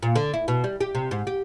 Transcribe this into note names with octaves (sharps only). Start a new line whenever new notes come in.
A#2
D3
E4
B2
G3
G4
C3
G#2
G4